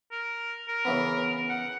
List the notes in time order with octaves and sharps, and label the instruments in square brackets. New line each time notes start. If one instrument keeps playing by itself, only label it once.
[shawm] A#4
A#4
[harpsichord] C#3 E3 B3
[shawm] F#5